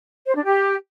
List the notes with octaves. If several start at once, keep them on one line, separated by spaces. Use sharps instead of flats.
C5
D4
G4